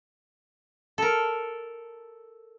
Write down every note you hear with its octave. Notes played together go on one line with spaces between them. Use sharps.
A4 A#4